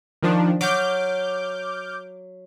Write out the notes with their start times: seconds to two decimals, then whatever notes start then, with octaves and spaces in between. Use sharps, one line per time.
0.23 D#3 F3 D4
0.61 F#3 D6 F6 G6